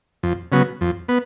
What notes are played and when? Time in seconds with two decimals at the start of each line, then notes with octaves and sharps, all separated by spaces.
0.23 F2
0.52 C#3 F#3 B3
0.81 F2
1.08 B3